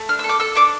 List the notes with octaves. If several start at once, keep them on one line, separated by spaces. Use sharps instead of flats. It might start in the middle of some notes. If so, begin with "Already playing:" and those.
Already playing: A3
D4 F6
E6
A4
D6
A4 E6
D4 D6